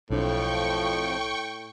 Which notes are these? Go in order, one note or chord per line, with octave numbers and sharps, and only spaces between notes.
B1 F2 A2 F3 D4 G5 C#6